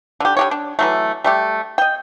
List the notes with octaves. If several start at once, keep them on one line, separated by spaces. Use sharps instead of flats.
D3 G4
D3 G4 C#5
D4
E3 F#3 A3
G3 A3 G4
D#5 G5